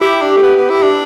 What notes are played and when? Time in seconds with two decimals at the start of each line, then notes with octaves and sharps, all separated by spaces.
0.01 E4 G4
0.22 D4
0.37 A3
0.42 B3
0.56 B3
0.70 E4
0.83 D4